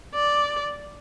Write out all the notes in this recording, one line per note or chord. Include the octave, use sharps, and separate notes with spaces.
D5